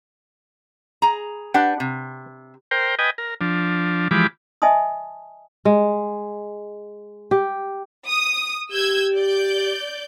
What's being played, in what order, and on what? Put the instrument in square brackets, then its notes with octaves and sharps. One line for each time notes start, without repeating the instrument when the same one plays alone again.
[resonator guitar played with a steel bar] G#4 A#5
[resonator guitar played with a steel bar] D4 G4 B4 [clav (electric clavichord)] F#5
[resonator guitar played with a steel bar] C3
[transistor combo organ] A#4 C5 G5
B4 D#5 G5 G#5
A#4
F3 D4
E3 F3 G#3 G4 B5 D6
[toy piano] D#5 E5 G#5 A5 C6 D#6
[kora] G#3
G4
[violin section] D#6
[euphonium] G4 [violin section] E6 G6 G#6
[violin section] D5 G6